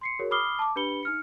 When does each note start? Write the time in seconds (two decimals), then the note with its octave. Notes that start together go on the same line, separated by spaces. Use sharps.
0.01 C6 C7 C#7
0.19 F#4 G#4 A#4 C#5
0.31 B5 D6 D#6 F6 C7 G7
0.59 A5 D6
0.76 D4 G4 B4 B5 C#7 G7
1.03 D#4 F6 C#7